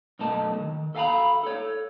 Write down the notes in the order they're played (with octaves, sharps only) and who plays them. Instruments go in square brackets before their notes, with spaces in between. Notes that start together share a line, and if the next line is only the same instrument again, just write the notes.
[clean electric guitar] B1 F#2 A3 A#4 D#5 A5
D#3
A4 E5 F5 G#5 A#5 B5
A4 C#5